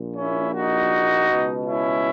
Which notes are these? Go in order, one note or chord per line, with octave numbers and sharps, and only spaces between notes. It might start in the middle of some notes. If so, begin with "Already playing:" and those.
Already playing: A#1 A#2
C#4 E4
D#4 F#4
C#2 B2
C#4 E4